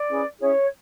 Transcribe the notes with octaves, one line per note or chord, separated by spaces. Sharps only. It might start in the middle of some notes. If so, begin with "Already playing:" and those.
Already playing: D5
C#4 E4 G#4 B4
C#4 E4 G#4 C#5